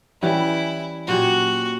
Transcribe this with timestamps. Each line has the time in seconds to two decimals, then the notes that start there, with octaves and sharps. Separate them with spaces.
0.22 E3 G3 C#4 E4
1.07 A#2 F#3 C#4 F#4 G4